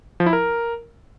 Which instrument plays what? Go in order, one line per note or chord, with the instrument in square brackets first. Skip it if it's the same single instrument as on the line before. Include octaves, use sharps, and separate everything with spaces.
[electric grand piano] F3
E4
A#4